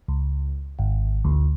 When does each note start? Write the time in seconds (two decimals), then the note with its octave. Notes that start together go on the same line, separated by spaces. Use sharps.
0.08 C#2
0.79 G#1
1.25 D2